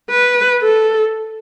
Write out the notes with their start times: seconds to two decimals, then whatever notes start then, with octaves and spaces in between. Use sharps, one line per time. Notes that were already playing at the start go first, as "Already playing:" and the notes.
0.10 B4
0.62 A4